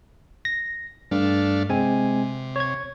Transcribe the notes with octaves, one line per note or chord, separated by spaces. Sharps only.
A#6
G2 A3 D4 F5
C3 G#3 C4 G#5
C#5 G#6